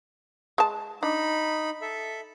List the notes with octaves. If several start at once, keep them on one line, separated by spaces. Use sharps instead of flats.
G#3 A5
D4 D#4 B5
A4 E5